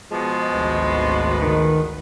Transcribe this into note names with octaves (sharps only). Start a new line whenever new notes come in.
B2 F3 G#3
G#1 D2 B4
D#3